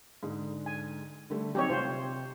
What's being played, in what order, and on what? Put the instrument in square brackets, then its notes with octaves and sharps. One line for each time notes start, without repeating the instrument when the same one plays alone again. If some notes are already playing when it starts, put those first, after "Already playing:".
[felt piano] G#2 D3 G#3
[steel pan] G#5
[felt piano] D3 G3 A3
[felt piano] F#3 C4 D#4 [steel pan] G4 C#5
[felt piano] C3 [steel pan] F4 C5